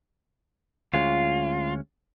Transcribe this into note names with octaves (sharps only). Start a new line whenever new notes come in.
D2 G#3 C#4 F4